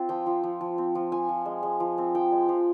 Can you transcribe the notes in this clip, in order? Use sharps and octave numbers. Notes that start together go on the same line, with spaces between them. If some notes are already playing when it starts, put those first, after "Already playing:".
Already playing: C4 F4
F3 G5
F3
F3
F3
C4
F3
F3 G#5
F3
G#3
G#3
F3
C4
F3 G5
G#3
F3